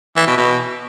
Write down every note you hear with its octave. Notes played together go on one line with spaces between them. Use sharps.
E3
B2
B2